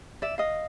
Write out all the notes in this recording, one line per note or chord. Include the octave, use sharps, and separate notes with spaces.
D5 E5
D#5 F5